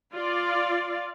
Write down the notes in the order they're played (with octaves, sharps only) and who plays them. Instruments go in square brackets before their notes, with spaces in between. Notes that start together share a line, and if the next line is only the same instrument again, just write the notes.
[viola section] F4 D5 F5